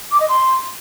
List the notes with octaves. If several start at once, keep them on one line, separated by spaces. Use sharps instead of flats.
D6
D#5
C6